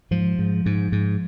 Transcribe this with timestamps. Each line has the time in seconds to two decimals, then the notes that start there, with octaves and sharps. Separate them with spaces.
0.11 G#2 F3
0.39 G#2
0.66 G#2
0.92 G#2